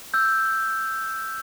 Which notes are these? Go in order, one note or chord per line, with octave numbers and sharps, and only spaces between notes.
E6 G6